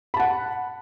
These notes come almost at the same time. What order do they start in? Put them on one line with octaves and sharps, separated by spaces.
B5 A5 F#5